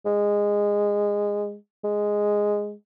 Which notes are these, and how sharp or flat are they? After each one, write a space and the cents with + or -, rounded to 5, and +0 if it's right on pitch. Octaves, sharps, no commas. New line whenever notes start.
G#3 -15
G#3 -5